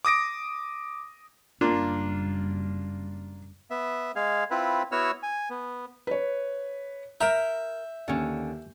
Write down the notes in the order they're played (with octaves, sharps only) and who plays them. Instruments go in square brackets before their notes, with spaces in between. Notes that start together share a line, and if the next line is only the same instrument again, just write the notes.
[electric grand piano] D6 D#6 A#6 D7
[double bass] F#1 G3 [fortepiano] A#3 D4 F4
[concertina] B3 E5
G#3 G#4 F5
C4 E4 F4 B4
B3 E4 F#4 C#5 E6 F6
G#5
B3
[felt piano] B4 C#5
[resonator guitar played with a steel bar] A#4 A#5 [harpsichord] E5 [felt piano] G6
[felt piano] D#2 [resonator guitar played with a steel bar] D3 C#4